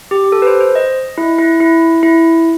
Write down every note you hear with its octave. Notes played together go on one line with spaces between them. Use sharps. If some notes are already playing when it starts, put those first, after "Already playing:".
G4
G4
A4
B4
C5
C5
D#5
E4
E4
E4
E4